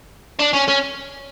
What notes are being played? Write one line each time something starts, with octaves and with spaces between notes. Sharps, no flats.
D4
C#4
C#4